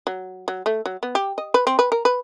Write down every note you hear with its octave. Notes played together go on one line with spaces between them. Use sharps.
F#3
F#3
A3
F#3
B3
G4
D#5
B4
C4
B4
A#4
B4